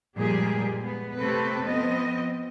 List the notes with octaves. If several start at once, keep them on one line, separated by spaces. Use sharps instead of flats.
G2 A#2 F3 G#3 G4 G#4
B3
C3 A3 C4 A4 B4
F3 B3 C4 D#5